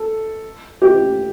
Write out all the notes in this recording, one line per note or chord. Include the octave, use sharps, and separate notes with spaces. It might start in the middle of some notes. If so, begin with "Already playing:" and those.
Already playing: A4
G4